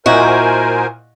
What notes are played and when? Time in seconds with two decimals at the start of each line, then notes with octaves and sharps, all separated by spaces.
0.06 A#2 E4 F#4 A#4 C5 D#5 G#5